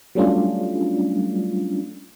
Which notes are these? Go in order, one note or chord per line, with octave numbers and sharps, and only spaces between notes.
F#3 G3 A3 C#4 D4 F4